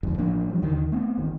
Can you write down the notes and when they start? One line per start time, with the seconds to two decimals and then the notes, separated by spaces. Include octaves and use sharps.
0.03 G1 F2 G#2
0.18 A1 F3 A#3 D4
0.50 F3 G3
0.62 D#2 D3 D#3
0.92 A3 B3 C4
1.18 G1 D#3